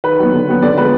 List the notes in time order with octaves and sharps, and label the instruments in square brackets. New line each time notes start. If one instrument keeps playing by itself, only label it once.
[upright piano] D#3 B4
F#3 B3
D3
F#3 B3
D3 D5
F3 G#3 B3 B4